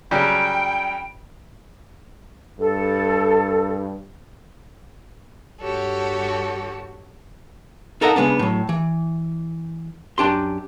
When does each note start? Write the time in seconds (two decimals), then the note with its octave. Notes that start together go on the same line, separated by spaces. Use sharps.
0.11 C#3 F#3 G3 G5
2.60 G2 A4
5.62 G2 F#4 G4 A4 C#5
8.01 D#4 A4 A#4 D#5 E5 F#5
8.16 C#3 G#3 B3 D4
8.39 A2 F#3
8.69 E3
10.18 F#2 D4 G4 C6